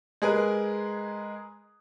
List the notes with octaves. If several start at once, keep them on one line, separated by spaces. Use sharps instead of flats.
G#3 G#4 A#4 B4